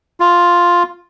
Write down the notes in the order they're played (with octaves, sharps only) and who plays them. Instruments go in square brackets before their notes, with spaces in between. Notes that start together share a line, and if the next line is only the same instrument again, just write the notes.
[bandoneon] F4